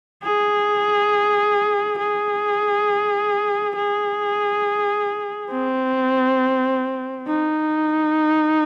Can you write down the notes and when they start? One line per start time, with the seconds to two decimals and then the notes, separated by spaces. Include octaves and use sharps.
0.23 G#4
1.99 G#4
3.75 G#4
5.50 C4
7.27 D#4